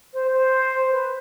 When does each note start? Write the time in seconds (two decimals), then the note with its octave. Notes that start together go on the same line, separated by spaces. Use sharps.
0.13 C5
0.33 C5
0.90 B4